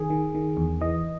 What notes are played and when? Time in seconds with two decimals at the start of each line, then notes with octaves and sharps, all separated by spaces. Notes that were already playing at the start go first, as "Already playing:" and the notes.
Already playing: D#3 G#4
0.10 D#3
0.35 D#3
0.57 E2
0.81 E3 D#5